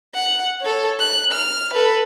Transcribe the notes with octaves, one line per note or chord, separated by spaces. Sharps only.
F#5
A4 C#5
F#6
F6
A4 B4